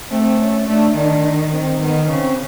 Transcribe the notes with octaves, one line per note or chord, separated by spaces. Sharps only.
A3 C4
C#4
A3 D4
D#3 D4
C4
D#3 B3
C#3 C4